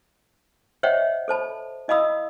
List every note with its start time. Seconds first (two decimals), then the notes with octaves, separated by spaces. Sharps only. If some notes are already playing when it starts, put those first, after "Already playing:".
0.83 C5 C#5 D#5 E5 F#5 G5
1.28 A4 C5 A5 B5
1.88 E4 D#5 F5 B5 D#6 E6